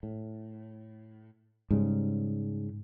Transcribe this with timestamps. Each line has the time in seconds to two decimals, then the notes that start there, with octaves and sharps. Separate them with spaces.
0.03 A2
1.71 G#2 C#3 G3